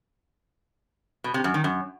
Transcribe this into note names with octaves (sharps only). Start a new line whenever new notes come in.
B2
C3
F#2
D#3
F#2